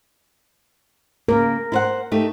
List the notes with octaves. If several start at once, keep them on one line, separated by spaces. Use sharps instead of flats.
C#3 A#3 A#4
E4 C5 F#5
A3 D#4 G4